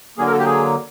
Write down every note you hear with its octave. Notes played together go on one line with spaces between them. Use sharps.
D3 F#3 A#3 G#4
A#4
A4
G4
G#4